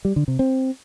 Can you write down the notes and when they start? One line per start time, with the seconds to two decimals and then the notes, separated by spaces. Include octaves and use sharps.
0.05 G3
0.16 D3
0.28 C3
0.39 C4